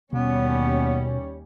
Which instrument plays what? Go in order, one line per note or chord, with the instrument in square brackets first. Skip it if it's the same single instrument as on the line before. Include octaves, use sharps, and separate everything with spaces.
[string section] D#2 G3 C#4 [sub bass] B2 [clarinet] B3